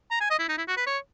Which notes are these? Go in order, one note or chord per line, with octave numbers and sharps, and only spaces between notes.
A#5
G#5
D#5
E4
D#4
E4
F#4
B4
C#5